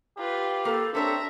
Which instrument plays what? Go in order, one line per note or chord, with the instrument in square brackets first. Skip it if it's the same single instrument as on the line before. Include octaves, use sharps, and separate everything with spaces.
[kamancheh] F4 B4 [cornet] G4
[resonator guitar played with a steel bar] A#3 [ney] A4
[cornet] C4 [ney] D4 [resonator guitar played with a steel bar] A4 B4 C#5 [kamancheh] E5 A#5